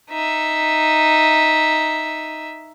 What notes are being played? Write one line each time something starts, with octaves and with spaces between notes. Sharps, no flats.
D#4 E5